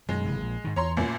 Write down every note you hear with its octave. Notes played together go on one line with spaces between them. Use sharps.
F#2 B2 D#3 G#3
F#1 C3 E3
A#1
G#2 D#3
E2 C#5 A#5 C6
A1 F#2 A#2